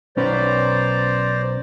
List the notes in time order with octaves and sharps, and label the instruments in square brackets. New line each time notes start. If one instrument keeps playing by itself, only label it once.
[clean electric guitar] B1 C#4 B4 [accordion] C5 D5 A#5